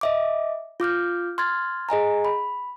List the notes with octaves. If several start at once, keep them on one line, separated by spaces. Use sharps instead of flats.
D#5 E5 D6
F4 D6 F6 G6
C6 F6 G#6 A6
G#4 D#5 G#5 A#5
B5